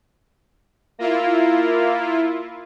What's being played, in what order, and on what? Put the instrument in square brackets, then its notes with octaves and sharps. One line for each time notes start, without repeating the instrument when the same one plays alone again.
[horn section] A#3 [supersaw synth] E4 F4